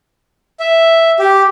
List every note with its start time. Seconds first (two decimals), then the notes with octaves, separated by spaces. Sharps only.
0.60 E5
1.19 G4